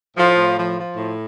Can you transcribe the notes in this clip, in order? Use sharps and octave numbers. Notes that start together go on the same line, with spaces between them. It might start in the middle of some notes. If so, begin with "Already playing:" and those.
A2 F3
A2
F3
F3
A2